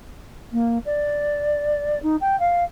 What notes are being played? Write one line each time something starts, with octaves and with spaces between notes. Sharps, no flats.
A#3
D5
D#4
G5
F5